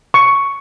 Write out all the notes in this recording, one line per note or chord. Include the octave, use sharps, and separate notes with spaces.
C#6